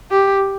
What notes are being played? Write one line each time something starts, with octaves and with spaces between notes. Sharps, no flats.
G4